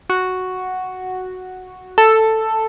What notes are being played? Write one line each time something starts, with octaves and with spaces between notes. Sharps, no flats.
F#4
A4